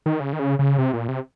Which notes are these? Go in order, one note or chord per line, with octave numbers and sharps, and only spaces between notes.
D#3
C#3
D#3
C#3
C#3
C3
A#2
C3